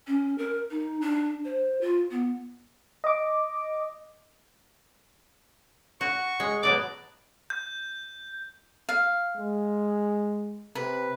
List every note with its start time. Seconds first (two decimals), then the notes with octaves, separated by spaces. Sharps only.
0.07 C#4
0.38 A#4
0.71 D#4
1.01 D4
1.45 C5
1.81 F4
2.11 B3
3.04 D#5 D6
6.01 F#4 C#6
6.40 G#3
6.63 B2 F#3 D5 D6
7.50 G6
8.89 F5
9.36 G#3
10.75 C3 B4